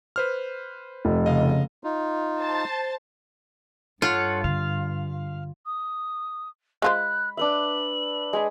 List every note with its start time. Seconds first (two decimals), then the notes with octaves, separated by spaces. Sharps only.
0.16 B4 C5 F6
1.05 F1
1.26 C#3 D#5 F5
1.84 D#4 F4
2.40 C5 A5
4.02 G2 F4 A4 C#5 F#5
4.44 D3 F5
5.65 D#6
6.82 G#3 F4 C5 B5 F#6
7.37 D4 B4 E5 F#7
8.33 G#3 G#5 B5